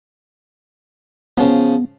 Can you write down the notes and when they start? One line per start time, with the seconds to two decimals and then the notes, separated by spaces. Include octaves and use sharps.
1.37 C#3 F3 B3